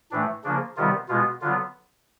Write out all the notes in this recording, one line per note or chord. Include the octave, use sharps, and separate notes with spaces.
A2 E3 A3 D4
C#3 F3 A#3 D4
C3 D#3 G3 B3 F4
B2 G#3 B3 F4
D3 F#3 B3 F4